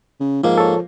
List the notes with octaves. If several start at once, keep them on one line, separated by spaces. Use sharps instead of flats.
C#3
G#2 F3 A#3
A4 C#5